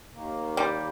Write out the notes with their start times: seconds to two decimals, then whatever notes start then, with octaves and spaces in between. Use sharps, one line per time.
0.13 D#2 D#3 A#3
0.57 G3